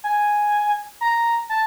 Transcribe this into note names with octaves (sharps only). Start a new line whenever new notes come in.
G#5
A#5
A5